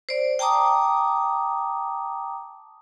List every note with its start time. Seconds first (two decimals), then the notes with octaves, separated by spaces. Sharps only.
0.09 C5 D5
0.39 G5 A5 A#5 D6 D#6